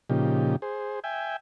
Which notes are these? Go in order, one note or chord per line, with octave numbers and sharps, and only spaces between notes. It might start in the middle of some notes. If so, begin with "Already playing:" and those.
A#2 C#3 F3 D#4 G4
G#4 C5
E5 G5 G#5